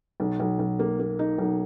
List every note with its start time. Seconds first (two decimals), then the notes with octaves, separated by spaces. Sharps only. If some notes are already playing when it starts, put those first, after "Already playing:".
0.20 B1
0.39 B1
0.59 B1
0.79 A#3
0.99 A#3
1.19 D#4
1.38 B1